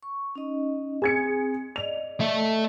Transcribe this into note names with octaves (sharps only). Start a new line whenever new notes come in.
C#6
C#4 D#4 D#5
C4 G#4 G#6 C#7
D5 D#5 F7
A3 E5